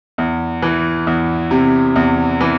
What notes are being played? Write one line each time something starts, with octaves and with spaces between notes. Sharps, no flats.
E2
E3
E2
C3
E2
E3